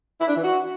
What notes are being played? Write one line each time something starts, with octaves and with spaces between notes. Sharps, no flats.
E4
D4
E3
F#4